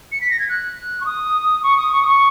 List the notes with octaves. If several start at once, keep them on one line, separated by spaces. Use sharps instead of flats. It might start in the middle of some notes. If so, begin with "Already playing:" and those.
C#7
B6
A#6
G#6
F#6
C#6
D#6
C#6
D#6
C#6
D#6
C#6